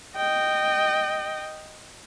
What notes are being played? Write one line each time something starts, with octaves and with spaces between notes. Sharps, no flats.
D#5 G5